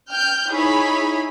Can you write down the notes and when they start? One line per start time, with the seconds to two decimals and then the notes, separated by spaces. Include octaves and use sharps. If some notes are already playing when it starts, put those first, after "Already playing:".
0.10 G5 F6 G6
0.50 D#4 E4 G#4 C#5 B5